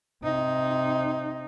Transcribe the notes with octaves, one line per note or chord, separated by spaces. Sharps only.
C3 D#4